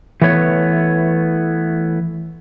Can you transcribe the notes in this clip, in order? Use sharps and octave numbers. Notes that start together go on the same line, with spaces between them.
E3 A3 B3 C#5